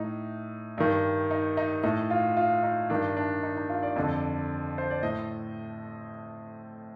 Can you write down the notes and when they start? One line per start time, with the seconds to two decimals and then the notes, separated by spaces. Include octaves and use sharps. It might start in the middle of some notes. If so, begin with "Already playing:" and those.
Already playing: A2 D#4
0.78 G2 D#3
1.31 D#4
1.57 D#4
1.83 A2 D#4
2.10 F4
2.37 F4
2.63 D#4
2.90 G2 D#3 D4
3.17 D4
3.43 D#4
3.56 D#4
3.70 F4
3.83 D5
3.96 F2 D3
4.78 C5
4.91 D5
5.03 A2 D#5